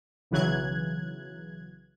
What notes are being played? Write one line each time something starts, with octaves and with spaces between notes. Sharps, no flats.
B1 C#3 E3 F#3 F#6 G#6